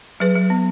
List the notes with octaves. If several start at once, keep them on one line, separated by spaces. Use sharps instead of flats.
F#3 G#4 B4
F#3
B3